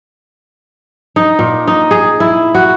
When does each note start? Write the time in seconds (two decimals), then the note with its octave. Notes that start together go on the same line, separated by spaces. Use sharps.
1.16 D#4
1.39 A#2
1.68 D#4
1.91 G#4
2.20 E4
2.55 F#4